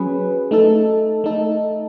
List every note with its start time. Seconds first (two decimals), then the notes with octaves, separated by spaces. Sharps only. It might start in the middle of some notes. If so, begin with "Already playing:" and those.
Already playing: F#3 C#4 G#4 B4
0.51 A3 D#4 A4
1.24 A3 D#4 A4